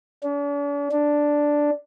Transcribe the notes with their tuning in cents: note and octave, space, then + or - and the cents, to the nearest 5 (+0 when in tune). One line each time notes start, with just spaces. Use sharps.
D4 -45
D4 +0